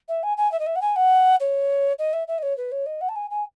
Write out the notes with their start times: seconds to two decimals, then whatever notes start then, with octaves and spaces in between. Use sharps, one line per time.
0.08 E5
0.23 G#5
0.37 G#5
0.51 E5
0.59 D#5
0.66 E5
0.75 F#5
0.81 G#5
0.96 F#5
1.40 C#5
1.98 D#5
2.13 E5
2.27 E5
2.38 D#5
2.42 C#5
2.57 B4
2.71 C#5
2.86 D#5
3.01 F#5
3.08 A5
3.15 G#5
3.30 G#5